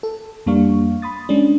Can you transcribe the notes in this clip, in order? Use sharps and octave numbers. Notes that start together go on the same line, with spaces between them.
A4
F2 G3 A#3 D4 F5 C#6
B5 C6 D#6 A6
G#3 C#4 D4